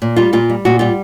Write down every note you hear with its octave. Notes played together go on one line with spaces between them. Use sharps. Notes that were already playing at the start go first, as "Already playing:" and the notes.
A#2
G3 F4
A#2 F4
G3
A#2 F#4
G3 F4